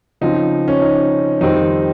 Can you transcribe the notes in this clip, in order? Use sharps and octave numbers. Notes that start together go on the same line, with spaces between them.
C#3 F3 C4 D#4
C#4
D#4
F2 D#3 G3 C4 D#4